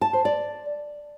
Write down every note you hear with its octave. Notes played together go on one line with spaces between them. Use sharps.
A5
C5
D5